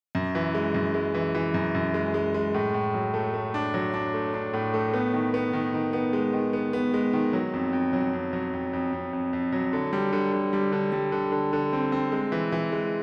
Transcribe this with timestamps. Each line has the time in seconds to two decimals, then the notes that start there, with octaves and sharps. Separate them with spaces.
0.15 F#2
0.35 E3
0.54 G#3
0.74 F#2
0.94 G#3
1.14 E3
1.35 E3
1.54 F#2
1.75 F#2
1.94 G#3
2.14 G#3
2.34 G#3
2.54 A2
2.74 A2
2.94 F#3
3.14 A3
3.34 A3
3.54 D4
3.74 F#3
3.94 D4
4.14 A3
4.34 D4
4.54 A2
4.74 A3
4.94 B3
5.14 D#3
5.34 B3
5.53 D#3
5.74 D#3
5.93 B3
6.13 G#3
6.33 D#3
6.53 B3
6.73 B3
6.94 G#3
7.13 D#3
7.33 F#3
7.54 F2
7.73 F2
7.93 F#3
8.13 F2
8.33 F#3
8.53 F2
8.73 F2
8.93 F2
9.13 F2
9.33 F2
9.53 F#3
9.73 D3
9.93 G3
10.13 D3
10.33 D3
10.53 G3
10.72 D3
10.92 G3
11.12 D3
11.32 D3
11.53 D3
11.73 C4
11.92 C4
12.12 G#3
12.32 E3
12.52 E3
12.72 G#3